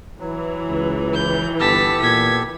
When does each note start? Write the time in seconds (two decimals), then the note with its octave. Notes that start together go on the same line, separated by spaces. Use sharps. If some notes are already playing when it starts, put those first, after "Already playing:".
0.20 E3 F#3
0.68 C#2
1.14 G6
1.60 G1 B3 G4 A4 A5 B6
2.00 A#2 G#6 B6